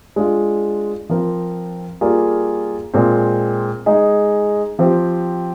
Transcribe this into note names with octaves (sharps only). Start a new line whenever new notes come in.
G#3 D4 F4
F3 C4 F4 A#4
G3 A#3 F4 G#4 D5
A#2 G#3 C4
G#3 D#4 G#4 D#5
F3 C4 G4 C5